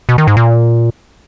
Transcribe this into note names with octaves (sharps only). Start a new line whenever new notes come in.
B2
D#3
G#2
A#2